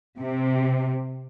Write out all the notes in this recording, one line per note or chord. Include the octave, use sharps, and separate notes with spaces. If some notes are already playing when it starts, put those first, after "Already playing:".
C3